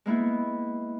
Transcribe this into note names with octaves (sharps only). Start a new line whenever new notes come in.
G#3 A#3 B3 E4